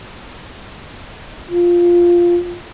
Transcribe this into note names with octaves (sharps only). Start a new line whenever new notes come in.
F4